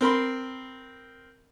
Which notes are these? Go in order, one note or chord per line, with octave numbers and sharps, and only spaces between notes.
C4 A#4 B5 C6